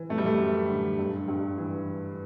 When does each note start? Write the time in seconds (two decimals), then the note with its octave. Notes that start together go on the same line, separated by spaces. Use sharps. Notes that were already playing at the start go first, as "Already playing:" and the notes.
Already playing: E3
0.10 F#2 A3
0.18 G3
0.26 A3
0.39 F#2
0.69 D3
0.99 G2
1.28 G2
1.58 E3